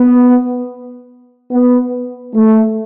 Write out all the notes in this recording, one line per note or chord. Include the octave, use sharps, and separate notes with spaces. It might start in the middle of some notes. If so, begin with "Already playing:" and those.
Already playing: B3
B3
A3